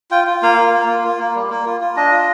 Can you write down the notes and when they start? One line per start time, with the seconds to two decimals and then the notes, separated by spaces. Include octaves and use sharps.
0.11 F4 G5
0.27 F4
0.43 A#3 F5
0.58 F4
0.73 A#3
0.89 A#3
1.04 F4
1.19 A#3
1.35 G3
1.50 A#3
1.66 F4
1.81 F4
1.96 D4 D#5
2.12 F4